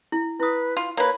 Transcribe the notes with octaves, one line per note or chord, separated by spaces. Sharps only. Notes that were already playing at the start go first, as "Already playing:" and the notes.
E4
E4 B4 D#6
F4
A#3 B4 C#5